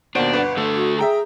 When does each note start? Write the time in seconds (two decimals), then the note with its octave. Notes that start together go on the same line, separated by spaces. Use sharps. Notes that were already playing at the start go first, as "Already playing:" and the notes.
0.15 D#2 B2 A#3 D4 F#4 C5 D7
0.33 G1 B4 F#5
0.57 D3 A3 A4
0.75 F#4
0.99 G#4 E5 G5 A#5